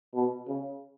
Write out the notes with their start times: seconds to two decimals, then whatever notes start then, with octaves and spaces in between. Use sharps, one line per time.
0.14 B2
0.48 C#3